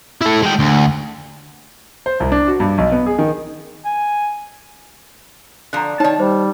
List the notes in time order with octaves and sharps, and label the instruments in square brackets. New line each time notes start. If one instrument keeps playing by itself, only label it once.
[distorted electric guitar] E4 A4
G#3 G5
D2
[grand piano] C5
C2
D4
F#4
G2
B1
B3
G#4
D#3
[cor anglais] G#5
[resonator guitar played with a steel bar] D3 F3 [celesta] A#5 F#6
[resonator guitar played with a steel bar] D#3 A5 [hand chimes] D#4 [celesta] C#5 D5
[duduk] G3 [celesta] C5